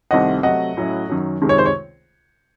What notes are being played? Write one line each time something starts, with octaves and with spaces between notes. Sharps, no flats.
C2 C3 D#3 A3 C4 D#5 F#5
C3 F#3 A3 D#5 F#5
A2 F#3 C#4 E4
F#2 D#3 F#3
C#2 C3 D#3 G#3
C#5
C5
C#5